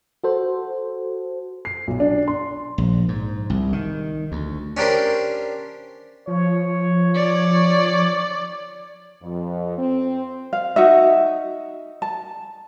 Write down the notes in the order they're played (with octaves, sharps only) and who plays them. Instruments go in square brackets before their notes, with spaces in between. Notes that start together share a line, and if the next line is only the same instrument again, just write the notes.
[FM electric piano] F#4 A4 C5
[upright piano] C7
B1
D4
C6
[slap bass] A#1
G#2
C2
D#3
D2
[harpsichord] C#4 D4 G4 A#4 C5
[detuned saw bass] F3 [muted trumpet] C#5
[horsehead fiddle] D5
[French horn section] F2
C4
[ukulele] F5
D#4 F#4 E5
A5